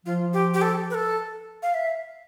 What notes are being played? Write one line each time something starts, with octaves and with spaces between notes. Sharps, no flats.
F3 F4
G4
G4
A4
B4
A4
F5
E5